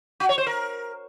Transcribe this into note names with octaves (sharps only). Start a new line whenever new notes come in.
F#4
C#5
C5
A#4